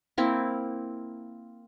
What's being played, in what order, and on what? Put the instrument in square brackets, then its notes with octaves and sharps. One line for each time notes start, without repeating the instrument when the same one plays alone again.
[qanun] A#3 C4 E4